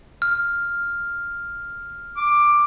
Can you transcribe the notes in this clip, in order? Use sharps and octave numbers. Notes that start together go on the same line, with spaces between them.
F6
D6